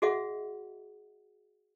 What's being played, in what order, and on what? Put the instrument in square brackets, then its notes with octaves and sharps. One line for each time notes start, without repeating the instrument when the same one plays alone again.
[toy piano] F#4 G#4 D#5 E5 F#5